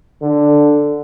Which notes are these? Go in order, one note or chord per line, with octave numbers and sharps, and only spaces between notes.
D3